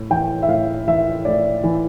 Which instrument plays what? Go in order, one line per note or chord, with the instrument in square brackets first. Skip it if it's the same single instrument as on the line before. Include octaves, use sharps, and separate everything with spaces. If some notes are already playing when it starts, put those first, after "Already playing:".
Already playing: [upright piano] A2
E3 G5
E5
A2 F5
E3 E5
A2 D5
E3